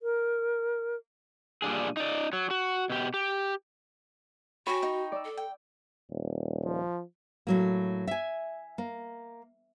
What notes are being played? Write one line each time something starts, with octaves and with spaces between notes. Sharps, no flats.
A#4
A#2 G3 D4 G#4
D#4 D5
F#3
F#4
B2 G4
G4
F#4 C#5 G5 G#5 B5 C#6
D#4 G5
D5 E6
A4
G5
D#1
F3
A2 F#3 A#3
E5 G#5
A#3